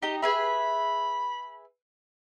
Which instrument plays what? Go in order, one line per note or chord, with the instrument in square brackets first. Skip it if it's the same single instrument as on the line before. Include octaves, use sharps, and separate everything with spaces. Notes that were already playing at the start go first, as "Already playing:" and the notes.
[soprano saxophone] D#4 [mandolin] G4 D#5
[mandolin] G#4 B4 E5 [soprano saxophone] B5